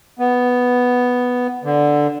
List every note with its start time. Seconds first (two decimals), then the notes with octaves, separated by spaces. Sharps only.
0.19 B3
1.64 D3